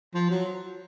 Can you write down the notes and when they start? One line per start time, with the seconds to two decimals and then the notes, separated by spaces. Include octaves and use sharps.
0.14 F3
0.30 F#3